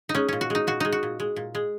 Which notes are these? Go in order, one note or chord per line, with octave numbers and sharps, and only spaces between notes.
D#4
G#3 C#4
A#2 C#4
F#4
G#3 D#4
A#2 F#4
G#3 D#4
F#4
A#2
G#3
A#2
G#3